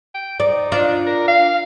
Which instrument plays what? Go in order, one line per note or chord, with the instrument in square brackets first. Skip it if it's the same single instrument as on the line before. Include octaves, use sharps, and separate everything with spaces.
[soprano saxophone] G5
[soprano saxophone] D#4 [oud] D5
[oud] D4 F4
[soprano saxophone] A#4
F5